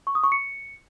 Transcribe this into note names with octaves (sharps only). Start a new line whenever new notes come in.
C#6
D#6
C#6
C#7